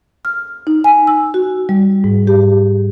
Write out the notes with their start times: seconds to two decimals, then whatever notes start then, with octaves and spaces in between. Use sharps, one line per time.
0.25 F6
0.67 D#4
0.84 G#5
1.07 E6
1.34 F#4
1.69 G3
2.04 G#2
2.27 G4